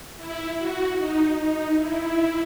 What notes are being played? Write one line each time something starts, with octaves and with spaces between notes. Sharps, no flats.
E4
F#4
D#4
D#4
E4